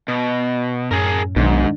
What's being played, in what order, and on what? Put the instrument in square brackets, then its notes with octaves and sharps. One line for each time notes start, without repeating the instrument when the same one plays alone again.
[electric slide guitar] B2
[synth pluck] F#2 A2 C#4 [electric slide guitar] G#4 A#4
[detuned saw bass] B1 [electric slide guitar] G#2 [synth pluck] D#3 D4